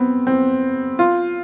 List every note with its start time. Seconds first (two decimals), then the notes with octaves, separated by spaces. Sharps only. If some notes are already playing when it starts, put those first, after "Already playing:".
Already playing: B3 C4
0.27 C4
0.99 F4